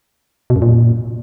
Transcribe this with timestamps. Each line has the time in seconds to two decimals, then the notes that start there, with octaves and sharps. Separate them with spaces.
0.50 B2
0.56 F#2
0.62 A#2